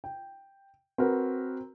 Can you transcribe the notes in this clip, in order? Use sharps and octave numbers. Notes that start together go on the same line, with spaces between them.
G5
C4 F#4 A#4 B4